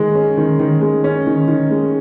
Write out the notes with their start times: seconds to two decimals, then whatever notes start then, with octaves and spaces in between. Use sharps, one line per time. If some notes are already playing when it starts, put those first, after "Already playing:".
Already playing: D#3 G#3
0.15 C#4
0.37 D#3
0.59 D#3
0.81 G#3
1.04 C#4
1.27 D#3
1.48 D#3
1.71 G#3